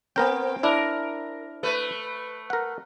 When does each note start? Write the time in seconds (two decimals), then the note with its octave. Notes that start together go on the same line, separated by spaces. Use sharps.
0.16 B3 C4 A#4 G5
0.63 D4 E4 A#4
1.63 A3 B4
2.50 A#4 F#5